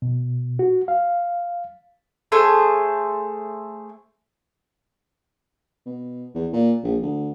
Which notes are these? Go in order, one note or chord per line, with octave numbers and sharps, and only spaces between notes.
B2
F#4
F5
A3 G#4 C5
B2
E2
A#2
A#1
D2